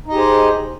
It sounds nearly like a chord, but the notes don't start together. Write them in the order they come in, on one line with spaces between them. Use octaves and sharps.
D#4 D#5 G4 G#4 C5